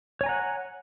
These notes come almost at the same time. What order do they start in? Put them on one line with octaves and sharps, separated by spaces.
C#5 G#5 A#5 F#5